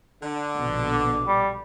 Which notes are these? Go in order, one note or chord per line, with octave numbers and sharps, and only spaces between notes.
D3
A#1 B2
D6
G3